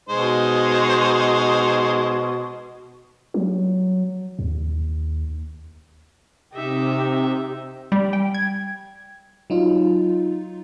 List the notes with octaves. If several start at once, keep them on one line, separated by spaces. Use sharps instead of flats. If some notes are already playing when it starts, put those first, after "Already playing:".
B2 G#3 D#4 C5
F#3
D#2
C3 D#4 G4 E5
G3
G5
G#6
F#3 D#4 F4